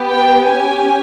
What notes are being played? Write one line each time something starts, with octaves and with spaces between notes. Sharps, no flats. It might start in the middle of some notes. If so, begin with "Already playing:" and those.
Already playing: B3 G4
G5
C#4 G4 G#5